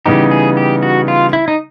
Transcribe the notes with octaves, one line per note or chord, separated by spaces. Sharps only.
C#3 E3 G3 B3 D#4 G4
G#4
G4
F#4
F4
E4
D#4